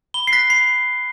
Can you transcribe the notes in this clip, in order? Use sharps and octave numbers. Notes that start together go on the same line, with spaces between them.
B5 G7
C7
F#6 B6
B5 C7